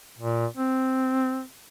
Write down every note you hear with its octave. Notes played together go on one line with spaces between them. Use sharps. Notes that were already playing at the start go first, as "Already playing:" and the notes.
A#2
C4